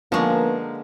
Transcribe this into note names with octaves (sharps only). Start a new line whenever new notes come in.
D3 F3 G#3 A#3 B3 C#4 A#4 C#6